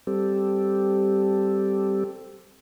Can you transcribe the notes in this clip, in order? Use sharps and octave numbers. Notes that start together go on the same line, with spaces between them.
G3 C4 G4 A4